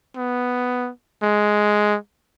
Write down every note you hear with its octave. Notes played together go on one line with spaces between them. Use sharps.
B3
G#3